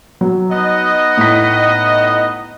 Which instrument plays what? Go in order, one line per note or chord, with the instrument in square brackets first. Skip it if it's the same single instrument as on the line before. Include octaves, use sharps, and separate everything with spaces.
[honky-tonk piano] F#3
[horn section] B3 D#4 D#5
[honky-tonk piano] A2 B6